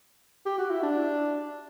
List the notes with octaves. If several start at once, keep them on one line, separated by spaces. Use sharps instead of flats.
G4
F#4
E4
D4